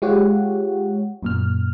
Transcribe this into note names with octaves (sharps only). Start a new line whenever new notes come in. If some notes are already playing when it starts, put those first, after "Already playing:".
G#3 F4 G4 C#5 F#5
F#2 A#2 F6